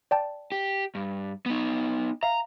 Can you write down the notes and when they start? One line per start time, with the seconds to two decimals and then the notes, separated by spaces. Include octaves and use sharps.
0.11 D5 G5 A5
0.52 G4
0.95 G2
1.46 B3 D#4
2.23 E5 F5 A#5